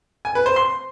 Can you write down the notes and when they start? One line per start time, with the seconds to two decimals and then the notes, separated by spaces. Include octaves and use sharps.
0.25 G#5
0.35 B4
0.46 C5
0.56 C6